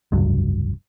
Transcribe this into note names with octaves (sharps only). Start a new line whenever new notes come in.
F1 C#2 G2 F#3